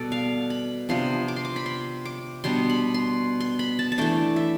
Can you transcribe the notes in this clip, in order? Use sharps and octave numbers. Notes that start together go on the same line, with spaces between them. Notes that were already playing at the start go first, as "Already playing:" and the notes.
Already playing: B2 G3 A4 D5
F5
B5
C3 F3 B3 D4 C6
D6
C6
D6
B5
C6
D6
B2 G3 B3 D4 C6
B5
C6
C6
B5
A5
A5
E3 A3 D4 G5
E5